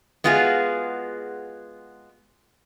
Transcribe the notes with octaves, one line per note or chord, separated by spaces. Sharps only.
G#3 B3 F4 F#4 G#4